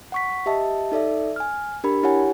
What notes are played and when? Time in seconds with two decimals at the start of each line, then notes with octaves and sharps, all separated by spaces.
0.12 F#5 C#6 B6
0.46 G4 D#5 E5 A5
0.92 D#4 A4 D5 E5
1.36 G#5 F6
1.84 D4 G4 A#4 B5
2.03 E4 G4 C#5 F#5 G#5